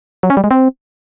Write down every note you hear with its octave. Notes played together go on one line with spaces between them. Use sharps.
F#3
C#4
G3
G#3
C4